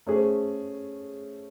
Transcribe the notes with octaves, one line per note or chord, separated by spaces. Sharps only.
A3 C#4 G#4 C5